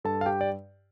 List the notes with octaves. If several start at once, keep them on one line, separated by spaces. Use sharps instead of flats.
G2 A4 A5
F5
G4 G5
D5